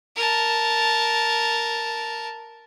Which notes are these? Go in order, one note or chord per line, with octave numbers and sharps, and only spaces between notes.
A#4 A5